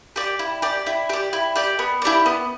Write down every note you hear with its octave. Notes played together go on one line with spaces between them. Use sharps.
G4 D5
E4
G4 D5
E4
G4 D5
E4
G4 D5
B3
E4 G4 D5
B3